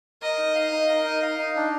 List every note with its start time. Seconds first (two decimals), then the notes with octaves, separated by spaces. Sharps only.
0.22 A#4 D#5
0.38 D#4
0.55 F5
0.72 D#4
0.89 A#4
1.05 D#4
1.22 F5
1.39 D#4
1.56 D4